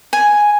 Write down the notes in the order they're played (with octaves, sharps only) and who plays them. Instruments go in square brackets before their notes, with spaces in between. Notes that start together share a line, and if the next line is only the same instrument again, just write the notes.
[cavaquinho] G#5